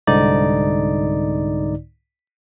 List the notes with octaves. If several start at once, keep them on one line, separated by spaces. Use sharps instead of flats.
C2 G#2 D3 D#4 D5